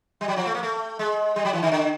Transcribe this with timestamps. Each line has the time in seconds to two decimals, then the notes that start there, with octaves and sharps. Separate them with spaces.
0.21 G3
0.28 F#3
0.36 F3
0.46 A3
0.55 A#3
0.63 A3
0.99 G#3
1.36 G3
1.45 F#3
1.53 E3
1.62 D#3
1.72 D3